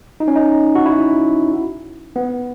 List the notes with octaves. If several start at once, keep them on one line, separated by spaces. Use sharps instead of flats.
D#4
C#4
D#4
F#4
E4
B3